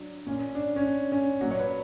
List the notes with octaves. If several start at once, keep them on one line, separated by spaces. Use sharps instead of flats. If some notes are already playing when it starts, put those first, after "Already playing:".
Already playing: F#3 D4
A#2 A#3 C#4
D4
C#4
D4
C#4
A#2 F#3 A#3 F#4
C#5
B4